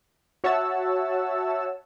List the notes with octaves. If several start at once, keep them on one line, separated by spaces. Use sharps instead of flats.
F#4 C#5 E5 F#5 A5 E6